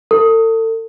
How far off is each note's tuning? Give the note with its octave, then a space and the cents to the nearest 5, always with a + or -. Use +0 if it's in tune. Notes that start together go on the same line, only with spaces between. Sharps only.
A4 +35